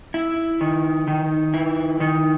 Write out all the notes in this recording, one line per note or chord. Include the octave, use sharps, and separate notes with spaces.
E4
D#3
D#3
E4
D#3